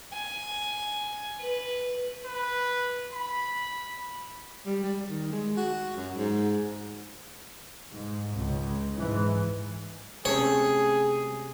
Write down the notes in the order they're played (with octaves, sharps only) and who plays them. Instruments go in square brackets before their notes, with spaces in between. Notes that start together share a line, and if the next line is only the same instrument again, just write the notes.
[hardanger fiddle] G#5
B4
[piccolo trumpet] B4
B5
[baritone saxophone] G3
G3
D#3
G#3
F#4
F#2
G#2
[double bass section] G#2
C#2
G#2 E3
[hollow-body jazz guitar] C3 A3 C#4 [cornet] G#4 [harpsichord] C#5